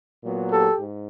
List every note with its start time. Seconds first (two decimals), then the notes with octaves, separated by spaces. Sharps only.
0.23 A#2 F#3 B3
0.51 G4 A4
0.79 G#2